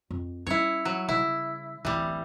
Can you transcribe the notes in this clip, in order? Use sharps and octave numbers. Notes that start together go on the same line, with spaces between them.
F2
G3 C#4 E4 C#5
F#3
C#3 G3 E4
D1 A1 E3 G3